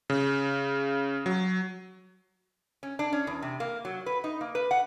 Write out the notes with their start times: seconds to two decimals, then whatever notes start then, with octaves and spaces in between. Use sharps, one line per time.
0.10 C#3
1.26 F#3
2.83 C#4
2.99 D4
3.13 C#4
3.27 E2
3.42 C3
3.60 A#3
3.85 F#3
4.06 B4
4.24 D#4
4.41 A#3
4.55 B4
4.71 F#5